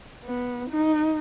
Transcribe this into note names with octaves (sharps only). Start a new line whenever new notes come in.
B3
D#4